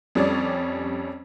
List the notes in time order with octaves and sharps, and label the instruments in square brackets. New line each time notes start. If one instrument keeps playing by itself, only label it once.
[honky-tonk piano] F2 G3 C#4 D5